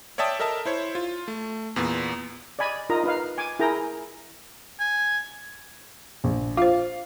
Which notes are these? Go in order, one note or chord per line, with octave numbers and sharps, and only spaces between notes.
C#5 D5 E5 G5 A5 D#6
A4 A#4 D#5 E5 A5
E4 C5 C#5
F4
A3
E2 A#2 B3
D5 D#5 G#5 B5
D#4 F4 A#4 D#5 A#5
D#4 B4 F5
G#5 D6
E4 G#4 A#4 G5 A#5
G#5
A#1
F4 C5 F5